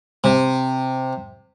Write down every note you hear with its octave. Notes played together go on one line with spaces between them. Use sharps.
C3